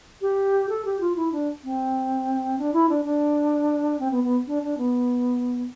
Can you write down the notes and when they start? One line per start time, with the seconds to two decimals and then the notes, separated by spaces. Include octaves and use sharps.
0.21 G4
0.69 A4
0.85 G4
1.00 F4
1.16 E4
1.32 D4
1.64 C4
2.58 D4
2.73 E4
2.89 D4
3.05 D4
4.00 C4
4.11 B3
4.24 B3
4.47 D4
4.63 D4
4.78 B3